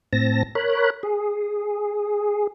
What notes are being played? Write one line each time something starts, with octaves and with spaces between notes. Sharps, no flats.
A2 C4 A5 A#6
A#4 C#5 B5 F#6
G#4